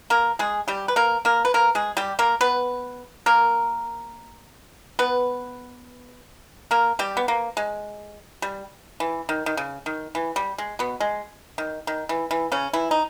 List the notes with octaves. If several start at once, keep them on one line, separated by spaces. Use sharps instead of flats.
A#3 A#4
G#3 G#4
G3 G4
B4
A#3 A#4
A#3 A#4
B4
A#3 A#4
G#3 G#4
G3 G4
A#3 A#4
B3 B4
A#3 A#4
B3 B4
A#3 A#4
G3 G4
B3
A#3
G#3
G3
E3
D#3
D#3
C#3
D#3
E3
G3
G#3
B2 B3
G#3
D#3
D#3
E3
E3
C#3 C#4
E3 E4
D#4